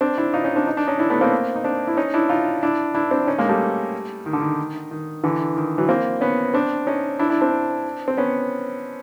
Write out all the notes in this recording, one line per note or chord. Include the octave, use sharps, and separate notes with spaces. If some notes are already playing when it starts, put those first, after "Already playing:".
C4 D4
D4 E4
D#4 F4
C#4 D#4
C4 D4
D#4
D4
C#4 D#4
D4 E4
A3 B3
A#3 C4
D#4
C4 D4
E4
C#4 D#4
D4 E4
D#4 F4
D4 E4
D4 E4
C4 D4
C#4 D#4
G#3 A#3
G3 A3
D#3
D3
D#3
D#3
D3 E3
D#3
E3 F#3
A#3 C4
B3 C#4
C4 D4
C#4 D#4
D4 E4
D4 E4
C4 D4
C4
B3 C#4